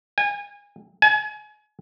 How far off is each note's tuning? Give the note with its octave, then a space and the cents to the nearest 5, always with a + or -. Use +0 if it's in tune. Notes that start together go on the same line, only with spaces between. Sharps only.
G#5 -30
G#5 +30